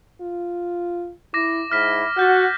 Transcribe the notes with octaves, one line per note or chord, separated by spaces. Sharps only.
F4
E4 D6 A#6
G#2 E4 F6 B6
F#4 F#5 F6 G6 A6